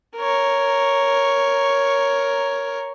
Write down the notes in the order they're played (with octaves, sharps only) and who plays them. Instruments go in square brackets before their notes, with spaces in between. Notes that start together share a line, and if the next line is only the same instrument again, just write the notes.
[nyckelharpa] A#4 C#5